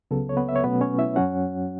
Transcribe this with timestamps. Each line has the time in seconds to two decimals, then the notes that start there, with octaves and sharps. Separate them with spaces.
0.11 C#2 C#3 F#3 B3 A4
0.29 C#5
0.37 B3 B4
0.49 E5
0.56 C#5
0.64 B2 F#3 A3 B3 C#4 B4
0.81 C#4 C#5
0.98 E4 E5
1.16 F#2 F#3 C#4 F#4 F#5